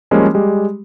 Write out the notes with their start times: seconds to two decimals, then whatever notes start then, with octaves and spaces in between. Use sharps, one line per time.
0.11 F3 G3 G#3 A#3 C#4
0.34 G3 G#3 G4